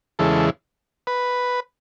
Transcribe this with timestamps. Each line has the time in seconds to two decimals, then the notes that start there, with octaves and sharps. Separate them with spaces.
0.19 E2 C#3 E3 G#3 A4
1.07 B4